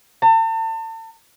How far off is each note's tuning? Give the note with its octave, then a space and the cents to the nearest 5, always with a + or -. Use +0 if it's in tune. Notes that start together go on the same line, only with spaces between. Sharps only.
A5 +40